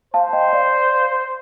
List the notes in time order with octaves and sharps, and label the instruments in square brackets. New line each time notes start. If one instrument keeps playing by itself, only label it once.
[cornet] C5 [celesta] F5 A5
[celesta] D#5 G5
D5 F5